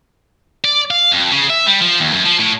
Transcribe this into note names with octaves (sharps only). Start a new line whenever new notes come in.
D5
F5
F2
C#3
E5
G3
F3
D#2
F#2
F3
A2